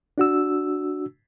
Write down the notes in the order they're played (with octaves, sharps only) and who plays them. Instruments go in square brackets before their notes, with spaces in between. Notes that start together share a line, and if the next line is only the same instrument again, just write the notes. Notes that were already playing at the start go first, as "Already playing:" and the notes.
[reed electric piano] D4 F#4 E6